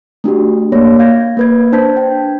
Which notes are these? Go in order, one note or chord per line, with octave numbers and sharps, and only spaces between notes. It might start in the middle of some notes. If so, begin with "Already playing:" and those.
A3 D4 F#4 G4
A#3 C#5 D5 A#6
F5 G6 G#6 A#6
A#3 B4 G#6
D4 C5 A5 G6 G#6 B6
G5